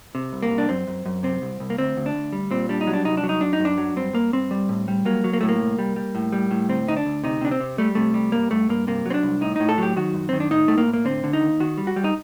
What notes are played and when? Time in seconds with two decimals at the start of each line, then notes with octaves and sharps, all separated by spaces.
0.15 C3
0.33 C2
0.43 A#3
0.51 C2
0.58 D4
0.69 F#2 C4
0.88 F#2
1.06 F#2
1.23 C3 C4
1.42 C2
1.60 C2
1.70 A#3
1.78 D2 C4
1.97 D2
2.06 D4
2.15 D2
2.33 G3
2.51 A#2 C4
2.69 G3 D4
2.81 D#4
2.87 F#3
2.93 D4
3.05 C2 D#4
3.17 D4
3.24 F#3
3.29 D#4
3.41 F#2 D4
3.53 D#4
3.60 F#2
3.65 D4
3.78 F#3
3.96 G2 C4
4.14 G2 A#3
4.33 G2 C4
4.51 G3
4.69 A2
4.88 G3
5.05 F#3 A#3
5.24 F#3
5.33 A#3
5.41 A2 A3
5.49 A#3
5.60 C2
5.79 G3
5.96 G3
6.15 A2
6.32 G3
6.51 A2
6.69 D2 C4
6.88 D2 D#4
6.97 D4
7.06 D2
7.23 C3 D#4
7.41 C3 D4
7.51 C4
7.60 C3
7.78 G3 A3
7.95 C3 A3
8.14 G3
8.32 G2 A#3
8.51 G2 A3
8.69 G2 A#3
8.87 C3 A#3
9.06 F#3 C4
9.14 D4
9.23 C2
9.41 A2 D#4
9.56 A2 D#4
9.69 A4
9.78 F#3 G4
9.96 D#3 F#4
10.14 F#2
10.29 D#3 C4
10.40 D4
10.50 A2 D#4
10.68 A2 A3
10.78 A#3
10.88 A2
10.94 A#3
11.05 D3 C4
11.24 D3
11.33 D#4
11.42 D#2
11.60 D#3 F#4
11.78 G3
11.87 F#4
11.96 G3
12.04 D#4